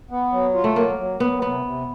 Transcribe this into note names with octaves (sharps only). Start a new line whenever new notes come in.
B3
F#3
F4
A3
F#3 A#3
F#3
F#3 B3
C3 B3
C3